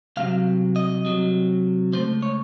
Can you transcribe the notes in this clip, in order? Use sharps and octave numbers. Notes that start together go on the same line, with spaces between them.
C2 C3 F#3 F5
D#5
C2 C3 F#3
C#2 C#3 A3 C5
C#5